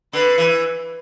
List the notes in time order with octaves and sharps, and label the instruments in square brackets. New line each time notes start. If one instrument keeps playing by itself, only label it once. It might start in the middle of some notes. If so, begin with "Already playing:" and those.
[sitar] D3 [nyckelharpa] B4
[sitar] E3